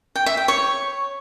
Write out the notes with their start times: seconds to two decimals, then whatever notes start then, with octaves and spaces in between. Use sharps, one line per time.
0.15 G5
0.26 E5
0.37 G5
0.48 C#5